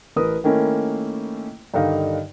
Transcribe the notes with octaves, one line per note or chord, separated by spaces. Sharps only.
A1 A#4 B4 D#6
D#3 A3 A#3 C#4 E4
G2 D3 D#3 D#4 F5